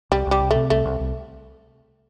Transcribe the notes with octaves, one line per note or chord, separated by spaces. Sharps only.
C2 G3
C2 G3
C3
A3
C3
C2 A3
C2
C2